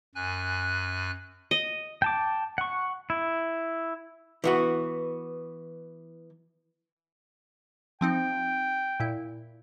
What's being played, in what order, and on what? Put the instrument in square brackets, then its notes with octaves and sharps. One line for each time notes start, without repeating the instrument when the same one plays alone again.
[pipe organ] F#2 G#5 F#6
[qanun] D#5
[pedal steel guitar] G5 A5 D6
F#5 C#6
E4
[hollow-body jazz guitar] E3 B3 F#4
[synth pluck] F3 C4 D#4 [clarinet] G5
[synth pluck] A#2 E4